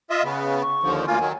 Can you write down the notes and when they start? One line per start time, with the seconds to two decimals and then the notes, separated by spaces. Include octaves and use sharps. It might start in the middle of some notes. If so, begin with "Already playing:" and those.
0.10 F4 D#5 E5
0.24 C#3 B3
0.62 C#6
0.83 D#2 D3 F3
1.07 D2 A#3 F4 G#5
1.20 D#3 F#3